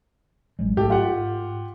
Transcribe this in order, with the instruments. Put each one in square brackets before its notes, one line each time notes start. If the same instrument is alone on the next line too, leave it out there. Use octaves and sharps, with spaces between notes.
[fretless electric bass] A1 F#3 G#3
[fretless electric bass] G#2 [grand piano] A3 G4
[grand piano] F4 G4 F#5